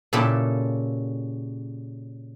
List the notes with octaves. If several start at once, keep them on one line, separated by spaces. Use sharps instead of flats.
A#2 C#3 E4 G4 A4